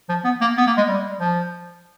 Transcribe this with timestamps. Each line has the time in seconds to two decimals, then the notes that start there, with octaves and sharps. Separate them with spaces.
0.09 F3
0.25 B3
0.41 A#3
0.58 B3
0.67 A#3
0.78 G#3
0.89 G3
1.20 F3